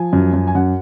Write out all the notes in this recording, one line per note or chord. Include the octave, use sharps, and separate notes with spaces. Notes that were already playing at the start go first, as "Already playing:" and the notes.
Already playing: F3 G#5
F#2
F#2
G#5
F#2 F#5